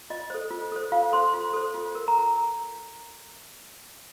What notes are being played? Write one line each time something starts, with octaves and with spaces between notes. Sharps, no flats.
F4 D#5
A4 C5
F4
A4 C5
F4 F5
A4 C5 C6
F4
A4 C5
F4
A#4
A#5